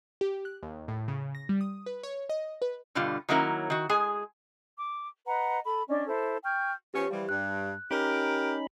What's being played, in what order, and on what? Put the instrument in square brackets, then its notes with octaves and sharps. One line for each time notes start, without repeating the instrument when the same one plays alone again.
[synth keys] G4
F#6
D#2
A2
C#3
A#6
G3
D#6
B4
C#5
D#5
B4
[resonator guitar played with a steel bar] G2 B2 D3 G3 F4
D#3 F#3 A#3 C#4 E4 A#4
D#3 F#4
G#3 G#4 G#5
[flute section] D6
B4 D#5 F#5 A#5
A4 B5
C#4 D4 D5 D#5
E4 A4 C5
G5 C#6 F6 G6
[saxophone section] F3 B3 C#4 [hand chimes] G4
[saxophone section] E3 F3 G3
[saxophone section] G2 [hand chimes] F#6
[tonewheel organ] C#4 D#4 B5 [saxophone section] G4 A#4